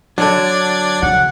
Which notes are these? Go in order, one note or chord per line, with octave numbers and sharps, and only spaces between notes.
D3 F#3 D4 D5 G#6
C#3 F#5